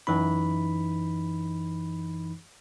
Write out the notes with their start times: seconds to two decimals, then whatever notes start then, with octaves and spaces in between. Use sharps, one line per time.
0.07 F#2 E3 D#4 B5